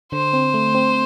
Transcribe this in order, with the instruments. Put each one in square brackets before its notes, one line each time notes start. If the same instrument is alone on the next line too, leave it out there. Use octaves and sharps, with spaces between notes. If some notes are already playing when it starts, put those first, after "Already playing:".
[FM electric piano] D3 [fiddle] C5
[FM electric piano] C4
A3
C4